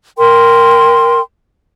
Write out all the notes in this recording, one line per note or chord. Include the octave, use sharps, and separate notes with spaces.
A#4 G5 C6